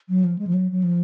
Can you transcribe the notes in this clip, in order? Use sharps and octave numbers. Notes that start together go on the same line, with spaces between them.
F#3
F3
G#3
F3
F#3
F#3
F3